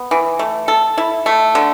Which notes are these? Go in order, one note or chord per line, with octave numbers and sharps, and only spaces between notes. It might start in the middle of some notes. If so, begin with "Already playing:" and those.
Already playing: B3
E3
A3
A4
E4
A3
D3